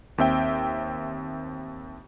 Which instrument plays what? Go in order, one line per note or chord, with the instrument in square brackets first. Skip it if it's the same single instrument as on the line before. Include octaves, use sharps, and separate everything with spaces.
[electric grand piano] D#2 C4 E5 G5